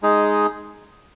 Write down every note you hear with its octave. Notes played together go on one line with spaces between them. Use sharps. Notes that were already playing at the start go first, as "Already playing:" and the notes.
G#3 D#4 G#4